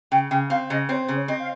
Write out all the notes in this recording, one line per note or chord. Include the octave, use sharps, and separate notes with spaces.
C#3 G5
C#3 G5
C4 F5
C#3 D#5
C4 C#5
C5
C#3
C#5
C4 D#5
F5